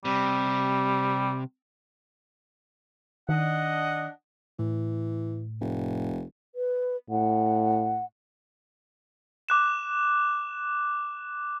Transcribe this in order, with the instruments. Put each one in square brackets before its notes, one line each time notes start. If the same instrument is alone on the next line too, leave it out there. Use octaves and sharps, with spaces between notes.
[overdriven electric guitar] C3 [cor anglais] G3
[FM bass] D#3 [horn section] D4 D#5 [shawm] F#5
[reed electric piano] A2 [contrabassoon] E3
[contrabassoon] F1
[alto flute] B4
[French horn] A2 [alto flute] F#5
[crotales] D6 F#6 E7